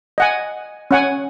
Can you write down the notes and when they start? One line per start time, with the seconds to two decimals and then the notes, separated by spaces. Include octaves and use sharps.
0.18 D#5 F#5 G#5
0.91 C#4 F#5 G#5